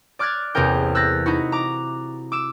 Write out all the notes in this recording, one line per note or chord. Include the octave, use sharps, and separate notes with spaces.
D5 D6 F6 F#6 G#6 A6
A1 E2 C3 G#4 A#4 G5
E6 F#6 G6 A6 A#6
D#4 E4 F#4
A#5 D6
D6 E6 E7